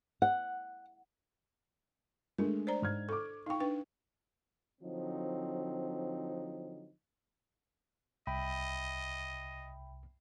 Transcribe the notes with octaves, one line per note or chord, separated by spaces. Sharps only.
F#5
G#3 A3 D4 A#4
C5 D5 A#5
G#2 F6 G#6
A4 C#6 D6
D#4 F5 G5 C#6
D4 B4 G5
D3 F3 F#3 C4 D#4
C2 D#5 E5 G5 B5